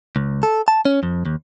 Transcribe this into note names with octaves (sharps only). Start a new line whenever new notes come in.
C#2
A4
A5
C#4
F2
D#2